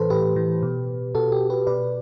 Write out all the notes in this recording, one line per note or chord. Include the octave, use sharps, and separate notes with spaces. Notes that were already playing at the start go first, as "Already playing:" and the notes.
Already playing: A2 E3 A4 B4 C5
A2 G4 B4
E3
B2
B2 F#4 A4
G4
G4 B4
B2 B4 D5